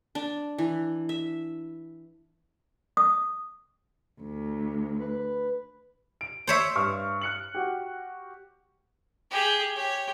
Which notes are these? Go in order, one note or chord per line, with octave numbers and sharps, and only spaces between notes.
D4
E3
E5
D#6
D2
B4
D7
C5 C#5 E5
G2 C#6 F6
F#6 C#7 F#7
F#4 G4
G4 G#4
G4 C#5